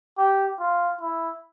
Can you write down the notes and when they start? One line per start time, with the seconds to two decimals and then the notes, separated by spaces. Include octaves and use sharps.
0.18 G4
0.60 F4
1.01 E4